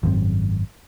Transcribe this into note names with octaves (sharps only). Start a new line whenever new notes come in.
G#1 F#2 D3 C4